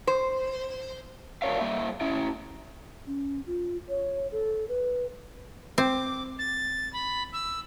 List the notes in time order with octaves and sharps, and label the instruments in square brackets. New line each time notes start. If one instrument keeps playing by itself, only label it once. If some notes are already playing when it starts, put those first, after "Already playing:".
[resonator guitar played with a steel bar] C5
[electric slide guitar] D4 F#4 A#4 C#5 E5 F5
G2 A#3 E5
C#4 E4 E5
[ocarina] C#4
F4
C#5
A4
B4
[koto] C4 [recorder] D6
[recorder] A6
B5
E6